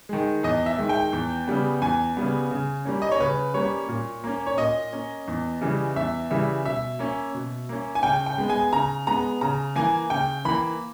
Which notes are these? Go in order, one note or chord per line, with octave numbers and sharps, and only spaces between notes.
D#3 G#3
E2 D#5
E5
D#3 G#3
G5
E2
C#3 G3 B3
E2 G#5
C#3 G3 B3
C#3
G3 A#3 C#4
D#5
C#5
C#3 B4
G3 A#3 C#4 C#5
A#2
A#3 C#4
C#5
A#2 D#5
A#3 C#4
E2
C#3 E3 G3
E2 E5
C#3 E3 G3 E5
B2 E5
A#3 C#4
B2
A#3 C#4
G#5
C#3 G5
G5
G#3 B3
G#5
C#3 A#5
G#3 B3 A#5
C#3 A#5
E3 A#3 G#5
C#3 G5
E3 A#3 B5